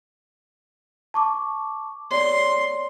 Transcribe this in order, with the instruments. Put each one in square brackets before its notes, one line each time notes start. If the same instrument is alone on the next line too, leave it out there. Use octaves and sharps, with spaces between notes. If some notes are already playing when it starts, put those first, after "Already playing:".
[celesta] A5 C#6 D6
[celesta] C#5 D5 [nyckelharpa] C6